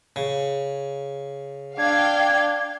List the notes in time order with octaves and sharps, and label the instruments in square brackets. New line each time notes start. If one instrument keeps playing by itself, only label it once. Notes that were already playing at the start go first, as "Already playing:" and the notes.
[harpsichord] C#3
[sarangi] D4 [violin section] F5 G5 [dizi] G#6